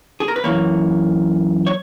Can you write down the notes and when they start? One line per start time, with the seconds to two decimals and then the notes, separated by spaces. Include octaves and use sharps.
0.20 G#4
0.28 A#4
0.36 B4
0.44 F#2 E3 A#3 C#5
1.67 C#5